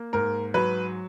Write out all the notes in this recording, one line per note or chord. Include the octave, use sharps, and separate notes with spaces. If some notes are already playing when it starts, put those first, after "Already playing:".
Already playing: A#3
G#2 A#4
F#3 B4